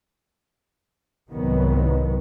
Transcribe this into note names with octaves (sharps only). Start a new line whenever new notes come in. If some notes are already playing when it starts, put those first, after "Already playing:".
C2 G#2 D#3 F#3 B3